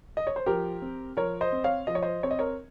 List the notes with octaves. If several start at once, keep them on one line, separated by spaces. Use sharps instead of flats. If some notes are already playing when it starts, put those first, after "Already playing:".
D#5
C#5
C5
F3 G4 A#4
C4
F3 A#4 C#5
C5 D#5
C4
C#5 F5
F3 D#5
C#5
C5 D#5
C4 C#5
D#5
A#4 C#5